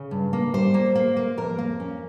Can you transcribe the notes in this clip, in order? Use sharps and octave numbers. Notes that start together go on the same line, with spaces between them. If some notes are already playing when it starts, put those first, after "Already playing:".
Already playing: C#3 C#5
G2
A#3
G3 C5
A#3
A#3
A#3
F2 A#4
A#3
C#4